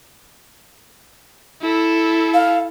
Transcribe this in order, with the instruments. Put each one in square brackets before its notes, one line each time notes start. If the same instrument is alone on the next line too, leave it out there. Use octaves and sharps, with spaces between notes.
[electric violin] E4 A4
[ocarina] F5